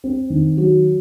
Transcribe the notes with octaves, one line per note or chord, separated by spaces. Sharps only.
C4
D#3
F#3